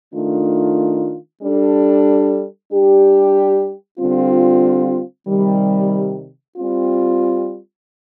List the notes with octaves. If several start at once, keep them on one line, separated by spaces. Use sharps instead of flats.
D#3 A3 D4 F4
G3 D4 A4
G3 D4 G4
D3 G3 C4 F4
C3 D#3 G3
G3 C4 F4